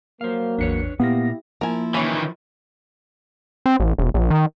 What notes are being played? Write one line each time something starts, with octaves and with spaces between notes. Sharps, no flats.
F#3 A#3 C5 F5
A1 E2 D4 B4 C#5 C#7
A#2 A#3 B3 E4 G4 F5 A#6
F3 A#3 E4 A#4 G#5
D#3 E3 C#4 B5
C4
A1
E1
A#1
D#3